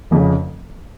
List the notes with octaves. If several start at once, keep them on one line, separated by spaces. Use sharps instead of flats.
F1 F2 C#3